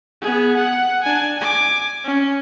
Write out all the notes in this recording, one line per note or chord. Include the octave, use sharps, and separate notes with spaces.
B3 G#4
F#5
D4 G#5
G#5 D6
C#4